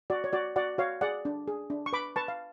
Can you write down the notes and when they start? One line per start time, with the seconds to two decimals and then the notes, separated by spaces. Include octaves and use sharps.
0.10 F#4 D5
0.24 C#5
0.33 F#4 D5
0.56 F#4 D5 F#5
0.78 F#4 C#5 F5
1.01 G#4 D5 F#5
1.25 D4
1.48 G#4
1.70 D4
1.86 C#6
1.93 B4 B5 D6
2.16 B4 A5 C#6
2.28 F5